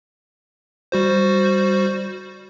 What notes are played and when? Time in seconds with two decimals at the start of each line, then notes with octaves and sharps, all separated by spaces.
0.92 G3 F#4 C5